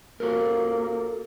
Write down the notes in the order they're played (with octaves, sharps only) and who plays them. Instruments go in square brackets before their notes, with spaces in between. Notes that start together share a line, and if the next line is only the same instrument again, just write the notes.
[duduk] A#3 [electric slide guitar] F#4 A4 A#4